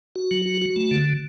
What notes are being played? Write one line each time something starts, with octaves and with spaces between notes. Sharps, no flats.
F#4
F#3
F#4
F#4
A3
D3